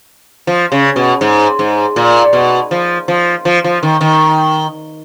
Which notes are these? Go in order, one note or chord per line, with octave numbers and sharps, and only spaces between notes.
F3
C#3
B2
G#2
G#2
A#2
B2
F3
F3
F3
F3
D#3
D#3